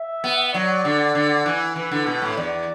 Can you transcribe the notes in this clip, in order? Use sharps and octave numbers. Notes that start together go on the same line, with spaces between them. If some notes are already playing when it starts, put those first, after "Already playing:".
Already playing: E5
B3
F#3 D5
D3
D3
E3
E3 B4
D3
B2
A2
E2 D5